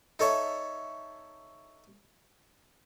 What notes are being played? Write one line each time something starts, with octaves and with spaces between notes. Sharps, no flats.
D#4 A4 C#5 E5